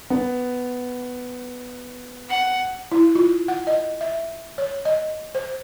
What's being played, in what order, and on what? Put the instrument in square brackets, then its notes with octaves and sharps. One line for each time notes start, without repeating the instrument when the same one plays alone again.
[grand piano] B3
[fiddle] F#5
[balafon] E4
F4
F#5
D#5
E5
C#5
D#5
C5